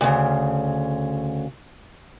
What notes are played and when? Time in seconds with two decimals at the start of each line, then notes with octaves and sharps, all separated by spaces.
0.01 D2 C#3